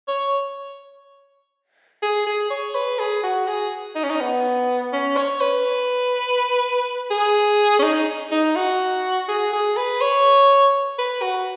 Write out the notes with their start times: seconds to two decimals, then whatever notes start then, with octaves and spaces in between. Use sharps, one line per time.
0.08 C#5
2.03 G#4
2.27 G#4
2.50 C#5
2.75 B4
3.00 G#4
3.23 F#4
3.47 G#4
3.96 D#4
4.04 C#4
4.10 D#4
4.20 B3
4.93 C#4
5.17 C#5
5.41 B4
7.11 G#4
7.79 C#4
7.83 D#4
8.31 D#4
8.56 F#4
9.28 G#4
9.53 G#4
9.77 B4
10.01 C#5
10.98 B4
11.22 F#4